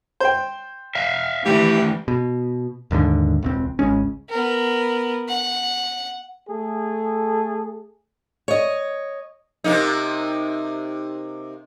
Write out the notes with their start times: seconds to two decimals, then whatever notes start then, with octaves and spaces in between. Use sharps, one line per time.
0.20 C5 G5
0.95 E5 F5
1.46 D#3 E3 A3 G4
2.08 B2
2.91 D#1 D#2 G#2 D3
3.42 E1 C#2 C4
3.79 G#1 C#2 G#3 C#4
4.30 B3 A#4
5.29 F#5
6.48 A3 G#4 A4
8.48 C#5 D#5
9.64 C3 A#3 D#4